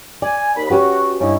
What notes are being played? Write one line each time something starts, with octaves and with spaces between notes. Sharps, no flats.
D5 G#5
D#2 B5
C#4 F#4 G4 B4
G2 C#4 D#4 E4